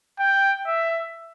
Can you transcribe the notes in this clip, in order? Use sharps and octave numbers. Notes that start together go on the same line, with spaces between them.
G5
E5